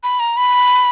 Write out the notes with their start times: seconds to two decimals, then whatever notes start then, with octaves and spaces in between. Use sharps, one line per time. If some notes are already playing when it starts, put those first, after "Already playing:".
0.03 B5
0.20 A#5
0.37 B5